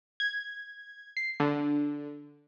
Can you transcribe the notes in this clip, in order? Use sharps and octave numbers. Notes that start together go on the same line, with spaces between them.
G#6
C7
D3